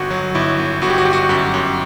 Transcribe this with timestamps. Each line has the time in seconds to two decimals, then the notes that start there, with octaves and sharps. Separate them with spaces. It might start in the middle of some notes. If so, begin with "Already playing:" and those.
Already playing: G1 F#4
0.11 F#3
0.35 G1 E4
0.59 G1
0.82 G1 F#4
0.90 G4
0.98 F#4
1.05 G1 G4
1.13 F#4
1.29 F#2 G4
1.54 F#2